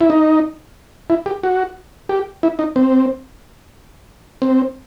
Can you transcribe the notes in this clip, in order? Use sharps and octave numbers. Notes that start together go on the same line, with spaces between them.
E4
D#4
E4
G4
F#4
G4
E4
D#4
C4
C4